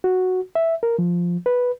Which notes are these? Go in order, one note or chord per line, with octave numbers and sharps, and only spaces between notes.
F#4
E5
A#4
F3
B4